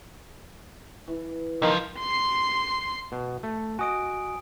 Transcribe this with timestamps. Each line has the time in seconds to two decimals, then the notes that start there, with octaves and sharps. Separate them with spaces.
1.08 E3
1.62 C#2 D#3 F3
1.99 C6 C7
3.12 B2
3.43 A3
3.79 F#4 D#5 G#5 D#6 D7